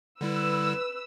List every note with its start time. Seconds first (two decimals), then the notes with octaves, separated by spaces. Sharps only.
0.21 D3 G3 E4 B4 E6